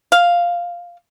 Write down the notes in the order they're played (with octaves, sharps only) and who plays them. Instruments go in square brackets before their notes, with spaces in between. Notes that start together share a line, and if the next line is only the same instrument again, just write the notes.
[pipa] F5